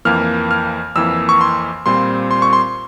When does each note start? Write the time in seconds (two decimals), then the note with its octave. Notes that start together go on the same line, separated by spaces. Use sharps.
0.05 F2 E3 A#3 F6
0.51 F6
0.96 F2 E3 A#3 E6
1.29 C#6
1.41 C6
1.86 A#2 G3 C4 F4 C6
2.31 C6
2.42 C#6
2.53 C6